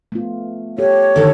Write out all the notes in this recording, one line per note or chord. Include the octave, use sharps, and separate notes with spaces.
A3 B3 F4
G4 A4 C#5
D3 D#3 A4